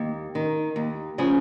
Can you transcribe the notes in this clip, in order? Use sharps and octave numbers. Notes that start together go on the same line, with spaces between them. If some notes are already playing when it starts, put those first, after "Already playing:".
Already playing: D#2
D#3
D#2
C#3 F3 G#4